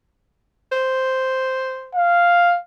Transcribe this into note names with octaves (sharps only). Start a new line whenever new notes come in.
C5
F5